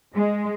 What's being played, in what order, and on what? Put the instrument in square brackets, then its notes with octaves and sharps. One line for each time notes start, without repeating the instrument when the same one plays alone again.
[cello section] G#3